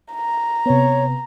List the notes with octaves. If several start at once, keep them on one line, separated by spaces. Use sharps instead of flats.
A#5
C3 B3 C#5